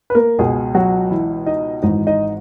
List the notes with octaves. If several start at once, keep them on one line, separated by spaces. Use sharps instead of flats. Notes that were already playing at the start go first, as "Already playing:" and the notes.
B4
A#3 A#4
C#2 B2 G#3 G#4
F#3 F#4
E3 E4
D#4 D#5
G#1 G#2 E3 D#4 D#5
D#4 D#5